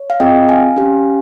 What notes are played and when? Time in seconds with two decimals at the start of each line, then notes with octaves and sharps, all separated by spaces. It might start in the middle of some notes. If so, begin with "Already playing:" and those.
Already playing: C#5
0.10 F5
0.20 C4 F4 G#4 D#5 G5
0.49 F5 G#5
0.76 C#4 G4